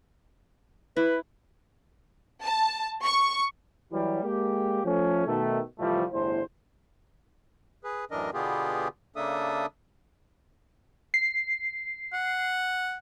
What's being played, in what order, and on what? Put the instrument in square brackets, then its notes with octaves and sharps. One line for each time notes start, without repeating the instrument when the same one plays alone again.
[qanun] E4 [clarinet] B4
[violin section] A5
C#6
[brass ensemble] E3 F#3 G3
G#3 A#3 G4
F3 A3 C#4
B2 D#3 A3
C2 F2 E3 F3 G3 A3
G1 E2 A2 E4 C5
[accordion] G#4 B4
F#2 A2 E3 D4 A#4 D#5
B2 D3 B3 F4 G4 G#4
C#3 A#3 D4 A4 E5 D#6
[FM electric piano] C7
[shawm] F#5